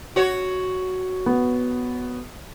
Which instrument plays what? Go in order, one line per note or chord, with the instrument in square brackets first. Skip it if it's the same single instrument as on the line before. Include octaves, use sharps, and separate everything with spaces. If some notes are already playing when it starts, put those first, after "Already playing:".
[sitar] F#4 C#5
[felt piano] B3